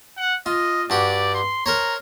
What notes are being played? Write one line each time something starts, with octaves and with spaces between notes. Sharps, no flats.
F#5
F4 D#5
G2 F#4 G4 D5
C6
A#4 C5 C#5 A#5